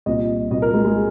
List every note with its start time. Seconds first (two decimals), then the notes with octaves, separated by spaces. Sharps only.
0.06 C2 A#2 D#5
0.51 C2 A#2 D#5
0.62 A#4
0.73 G#3
0.85 G#3